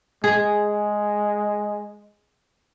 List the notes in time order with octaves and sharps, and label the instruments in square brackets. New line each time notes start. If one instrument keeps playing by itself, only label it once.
[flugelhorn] G#3 [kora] G#4